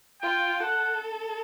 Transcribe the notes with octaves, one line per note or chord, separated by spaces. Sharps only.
F4 G5
A4 F#5